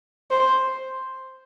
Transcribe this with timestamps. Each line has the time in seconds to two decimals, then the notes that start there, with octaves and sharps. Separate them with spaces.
0.31 C5